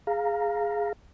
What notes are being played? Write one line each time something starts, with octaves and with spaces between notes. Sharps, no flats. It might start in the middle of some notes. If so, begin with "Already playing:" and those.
G#4 F5 A#5